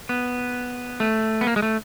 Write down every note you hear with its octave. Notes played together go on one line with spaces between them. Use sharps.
B3
A3
B3
A#3
G#3
A3